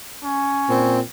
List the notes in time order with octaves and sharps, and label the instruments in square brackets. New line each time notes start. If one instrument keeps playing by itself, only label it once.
[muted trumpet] C#4
[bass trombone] A#2 [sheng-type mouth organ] C4